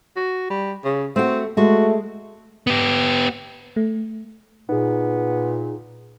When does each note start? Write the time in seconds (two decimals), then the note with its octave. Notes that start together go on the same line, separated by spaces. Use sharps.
0.16 F#4
0.50 G3
0.84 C#3
1.16 A3 C4 F#4
1.57 G#3 A3 F#4
2.67 B3 G4
3.76 A3
4.69 A#2 B3 D#4 G#4